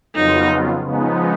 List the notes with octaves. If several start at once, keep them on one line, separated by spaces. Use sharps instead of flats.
F2 C#3 F#3 B3 D#4 F4
C#3 F3 G#3 B3 D#4